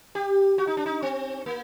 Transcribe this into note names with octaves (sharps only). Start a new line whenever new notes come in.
G4
F#4
D#4
D4
D#4
C4
A#3